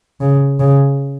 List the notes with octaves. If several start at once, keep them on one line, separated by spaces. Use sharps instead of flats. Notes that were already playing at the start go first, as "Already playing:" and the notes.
C#3
C#3